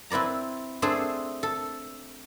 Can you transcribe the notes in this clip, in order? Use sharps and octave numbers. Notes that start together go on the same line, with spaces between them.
C4 E4 B4 D5 A#5
A3 C4 D4 G#4 A4 C5
A4